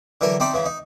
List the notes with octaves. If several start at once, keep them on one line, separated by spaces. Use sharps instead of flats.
D3 E3 F#3 A#4
C4 D#4 D5 E5 A5
C#3 E3
D#4